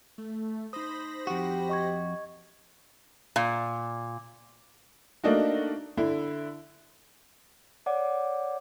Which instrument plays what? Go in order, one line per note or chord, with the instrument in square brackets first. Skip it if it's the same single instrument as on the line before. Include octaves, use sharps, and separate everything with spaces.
[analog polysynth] A3
[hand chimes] D#4 D#6 [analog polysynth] C5 B5 A#6
[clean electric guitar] F2 F#4 [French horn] G4
[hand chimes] D#5 C#6 G#6
[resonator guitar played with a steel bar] A#2
[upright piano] A3 A#3 D4 D#4 F#4
D3 E4
[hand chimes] C#5 D5 F#5 D6